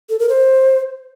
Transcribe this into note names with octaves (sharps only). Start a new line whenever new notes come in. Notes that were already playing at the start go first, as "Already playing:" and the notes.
A4
A#4
C5